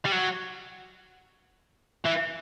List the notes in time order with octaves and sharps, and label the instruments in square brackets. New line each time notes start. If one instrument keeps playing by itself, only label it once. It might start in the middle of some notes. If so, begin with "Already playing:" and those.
[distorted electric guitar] G3
F#3
E3